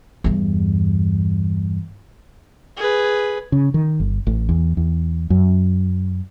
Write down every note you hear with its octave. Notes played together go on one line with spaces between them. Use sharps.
E2 G2
G#4 B4
C#3
D#3
G1
A1
E2
E2
F#2